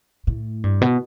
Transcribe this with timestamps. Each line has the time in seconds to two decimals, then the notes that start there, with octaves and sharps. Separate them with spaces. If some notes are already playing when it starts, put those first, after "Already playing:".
0.27 A2
0.64 G2
0.81 B2